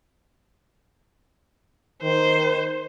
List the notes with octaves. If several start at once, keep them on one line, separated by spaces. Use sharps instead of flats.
D#3 C5